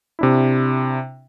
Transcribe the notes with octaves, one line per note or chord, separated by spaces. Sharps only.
C3 D4 E4